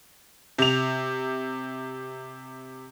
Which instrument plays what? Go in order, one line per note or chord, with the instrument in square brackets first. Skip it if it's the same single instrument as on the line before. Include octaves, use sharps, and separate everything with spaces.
[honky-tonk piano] C3 F7